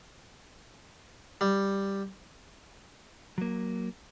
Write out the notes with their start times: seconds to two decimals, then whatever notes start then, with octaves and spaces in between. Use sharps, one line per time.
1.41 G3
3.38 F#3 A#3